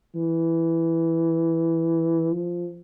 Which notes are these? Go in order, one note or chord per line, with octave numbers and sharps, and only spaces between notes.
E3
F3